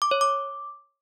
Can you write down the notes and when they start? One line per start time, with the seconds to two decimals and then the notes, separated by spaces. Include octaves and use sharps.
0.02 D6
0.11 C#5
0.21 D6